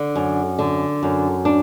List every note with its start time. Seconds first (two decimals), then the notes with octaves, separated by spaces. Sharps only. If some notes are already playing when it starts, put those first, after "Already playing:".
Already playing: D3
0.15 F#2
0.59 D3
1.03 F#2
1.45 D4